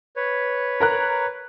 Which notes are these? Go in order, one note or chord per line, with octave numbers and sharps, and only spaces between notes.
B4 C#5
A#4 A#5 F#6